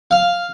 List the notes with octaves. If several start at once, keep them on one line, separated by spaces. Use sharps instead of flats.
F5